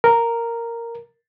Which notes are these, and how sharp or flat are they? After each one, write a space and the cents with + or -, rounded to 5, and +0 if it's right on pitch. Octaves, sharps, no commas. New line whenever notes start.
A#4 -5